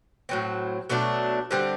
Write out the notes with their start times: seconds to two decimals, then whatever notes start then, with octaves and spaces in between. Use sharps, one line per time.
0.29 A2 F#3 C4
0.90 B2 F#3 A3 D4
1.51 D3 G3 C4